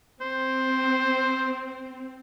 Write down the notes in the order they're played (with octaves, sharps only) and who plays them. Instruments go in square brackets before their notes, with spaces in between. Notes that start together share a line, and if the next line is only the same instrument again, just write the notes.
[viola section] C4 [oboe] C5